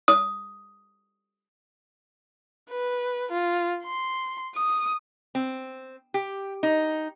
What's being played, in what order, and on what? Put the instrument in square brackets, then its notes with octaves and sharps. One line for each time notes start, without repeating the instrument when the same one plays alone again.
[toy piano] D#6
[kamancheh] B4
F4
C6
D#6
[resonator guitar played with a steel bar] C4
G4
D#4